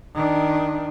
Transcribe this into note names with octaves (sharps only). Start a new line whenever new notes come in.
D#3 D4